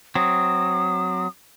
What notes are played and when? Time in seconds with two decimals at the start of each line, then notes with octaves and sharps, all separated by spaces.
0.15 F#3 C4 D#6